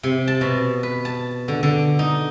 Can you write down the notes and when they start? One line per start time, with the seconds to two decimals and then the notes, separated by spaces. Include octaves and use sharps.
0.03 C3
0.28 A5
0.41 B2
0.83 B4
1.05 A5
1.48 D3
1.63 D3
1.99 D#4